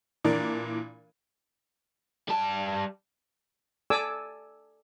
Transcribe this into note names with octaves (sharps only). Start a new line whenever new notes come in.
A#2 E3 D4 A#4
G3 A5
A4 D5 G#5 D6 E6